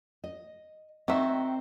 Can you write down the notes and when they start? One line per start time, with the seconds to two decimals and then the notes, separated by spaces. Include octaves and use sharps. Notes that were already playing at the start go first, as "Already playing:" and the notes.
0.24 D#5
1.08 D#3 C4 F#4 E5